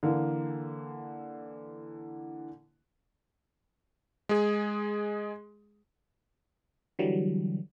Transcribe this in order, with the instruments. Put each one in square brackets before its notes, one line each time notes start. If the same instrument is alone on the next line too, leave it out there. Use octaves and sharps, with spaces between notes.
[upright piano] D3 E3 A#3
[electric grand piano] G#3 G#4
[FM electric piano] D3 E3 F#3 G3